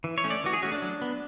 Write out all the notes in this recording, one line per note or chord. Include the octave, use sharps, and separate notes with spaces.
E3
C#5
A3 C#4
D5
E3 F#4
G#4
A3 C#4 F#4
D4
F#3
B3